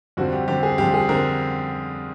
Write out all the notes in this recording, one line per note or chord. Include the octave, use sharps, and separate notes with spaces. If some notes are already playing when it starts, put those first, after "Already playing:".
F2 D3 G3 C4 F#4
G4
F2 D3 G3 C4 G4
G#4
F2 D3 G3 C4 G4
G#4
D3 G3 C4 A#4